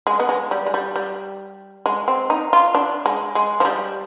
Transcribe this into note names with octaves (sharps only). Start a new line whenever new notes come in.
G#3
B3
G#3
G3
G#3
G3
G3
G#3
C4
D#4
F4
D4
G#3
G#3
F3
G3